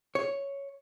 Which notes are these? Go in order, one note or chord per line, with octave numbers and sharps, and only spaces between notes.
C#5